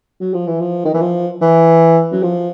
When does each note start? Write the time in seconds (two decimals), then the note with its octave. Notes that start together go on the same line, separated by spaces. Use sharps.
0.21 F#3
0.34 F3
0.47 E3
0.60 F3
0.85 D#3
0.94 E3
1.01 F3
1.42 E3
2.12 F#3
2.23 F3